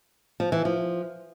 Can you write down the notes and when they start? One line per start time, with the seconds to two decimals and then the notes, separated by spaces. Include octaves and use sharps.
0.40 F3
0.52 E3
0.65 F3